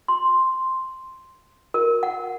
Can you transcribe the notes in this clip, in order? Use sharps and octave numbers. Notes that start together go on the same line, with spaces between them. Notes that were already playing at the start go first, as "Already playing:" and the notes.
C6
A#4
F#5